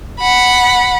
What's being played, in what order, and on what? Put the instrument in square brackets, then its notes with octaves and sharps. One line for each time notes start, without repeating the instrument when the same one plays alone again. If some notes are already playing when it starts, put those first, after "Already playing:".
[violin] F#5 B5